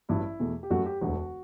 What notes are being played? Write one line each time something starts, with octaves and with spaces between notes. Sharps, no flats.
A1 G2 F#3 E4
E2 B2 A3
G4
F#2 F#3 A3 F#4
G4
E1 D2 D3 F#4